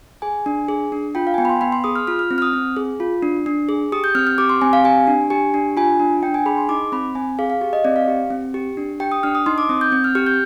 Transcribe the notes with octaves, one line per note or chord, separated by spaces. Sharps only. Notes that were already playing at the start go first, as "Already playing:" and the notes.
G#4 G#5
D4
G#4
D4
F4 G5
F5
G#5
B3 G5
B5
C6
B3 B5
C6
G#4 D#6
F6
F4 F6
F6
C4
F6
D#6
C4
G#4
F4
D4
D4
G#4
G4 D#6
G6
C4 F6
F6
G4 D6
C6
C4 G#5
F5
G4 G#5
D4
G4 G#5
D4
F4 G#5
D4
D4 G5
G#5
G#4 B5
C6
D#4 D6
C4 B5
C4 G#5
G#4 F5
F5
G4 F5
D#5
C4 D5
F5
G4
C4
G4
D4
G4 G5
D#6
D4 F6
D#6
D#4 C6
D6
C4 D#6
G6
C4
F6
G4 F6
G6